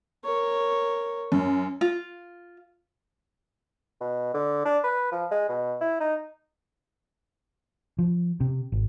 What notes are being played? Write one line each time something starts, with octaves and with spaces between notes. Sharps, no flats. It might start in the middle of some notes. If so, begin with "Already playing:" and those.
A#4 C#5
F#2
F4
B2
D3
D4
B4
F3
G#3
B2
E4
D#4
F3
C3
G#1